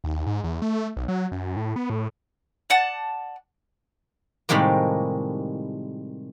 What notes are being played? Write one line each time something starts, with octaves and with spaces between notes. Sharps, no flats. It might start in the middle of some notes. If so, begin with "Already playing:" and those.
D#2
G#2
E2
A3
B1
F#3
F#2
A2
B3
A2
D5 F#5 A5
A2 C3 D#3 G3 G#3 A#3